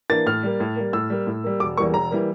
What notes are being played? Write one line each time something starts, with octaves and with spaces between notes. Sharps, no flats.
E3 A#3 D4 A6
A2 F6
G3 A#3
A2
G3 A#3
A2 E6
G3 A#3
A2
G3 A#3
E1 D6
E2 E3 G3 A#3 C#6
E1 A#5
E3 G3 A#3